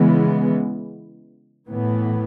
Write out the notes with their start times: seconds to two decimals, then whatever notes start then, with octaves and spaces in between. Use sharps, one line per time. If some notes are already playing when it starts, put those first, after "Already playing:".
Already playing: C#3 E3 G#3 B3
1.68 A2 E3 B3